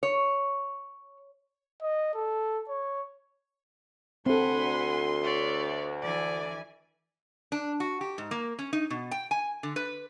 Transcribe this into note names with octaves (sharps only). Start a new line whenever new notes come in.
C#5
D#5
A4
C#5
D2 C4 A4 F#5 G#5 B5 C6
C#5 D5 E5
E3 D5 G#5
D4
F#4
G4
G#2
A#3
C#4
D#4
B2
G5
G#5
D3
B4